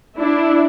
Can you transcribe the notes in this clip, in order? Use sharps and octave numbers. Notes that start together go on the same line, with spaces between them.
D4 E4